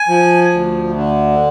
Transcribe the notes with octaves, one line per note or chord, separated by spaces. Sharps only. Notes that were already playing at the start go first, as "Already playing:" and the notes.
Already playing: G#5
F3
D2
D3